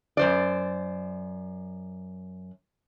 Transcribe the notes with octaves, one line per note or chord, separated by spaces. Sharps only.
F#2 C5 D5